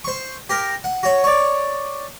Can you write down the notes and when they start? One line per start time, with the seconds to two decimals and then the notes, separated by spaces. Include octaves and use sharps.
0.04 C5 C#6
0.49 G4 A#4
0.84 F#5
1.03 F#4 C#5
1.24 C#5 D5